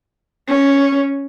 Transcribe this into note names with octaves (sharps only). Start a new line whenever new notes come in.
C#4